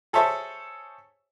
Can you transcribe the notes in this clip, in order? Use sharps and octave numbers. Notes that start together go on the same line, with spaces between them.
G#4 A4 C5 C#5 E5 A5